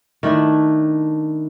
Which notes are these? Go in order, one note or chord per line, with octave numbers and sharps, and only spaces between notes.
D#3 A3 D4 E4